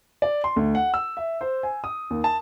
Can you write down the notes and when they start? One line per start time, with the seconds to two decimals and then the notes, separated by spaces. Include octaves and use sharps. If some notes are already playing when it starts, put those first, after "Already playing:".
0.22 D5
0.44 C6
0.56 D2
0.75 F#5
0.94 E6
1.17 E5
1.41 C5
1.63 G#5
1.84 D#6
2.10 D#2
2.24 A5